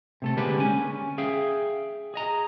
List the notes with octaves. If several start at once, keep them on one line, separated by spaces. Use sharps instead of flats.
C3 A3 A4
D3 G#3 A#3 G4 B4
C#4 G#5
G#4 E5 F5 G5
G#4 D#5 A#5